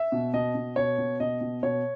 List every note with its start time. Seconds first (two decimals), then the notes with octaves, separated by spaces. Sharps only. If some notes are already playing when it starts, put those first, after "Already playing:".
Already playing: E5
0.12 B2
0.33 B2 D#5
0.55 B2
0.76 B2 C#5
0.98 B2
1.20 B2 D#5
1.41 B2
1.63 B2 C#5